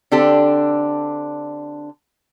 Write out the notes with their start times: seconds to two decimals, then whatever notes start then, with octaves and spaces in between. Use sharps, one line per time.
0.12 D3 C4 D4 G4 A4